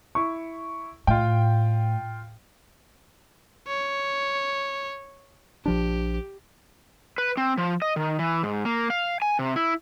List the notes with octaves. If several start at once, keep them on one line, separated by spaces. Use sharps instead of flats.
E4 C#6
A2 F4 G5
C#5
A#1 F3 D4 G4
B4
C4
F3
D#5
D#3
E3
G#2
A#3
F5
G#5
C3
E4